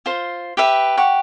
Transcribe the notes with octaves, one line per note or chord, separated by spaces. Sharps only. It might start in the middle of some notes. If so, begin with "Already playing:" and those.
F4 C5
G4 B4 E5
G4 F#5 C#6